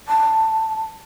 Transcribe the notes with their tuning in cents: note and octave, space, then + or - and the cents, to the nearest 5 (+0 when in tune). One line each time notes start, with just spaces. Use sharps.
A5 +10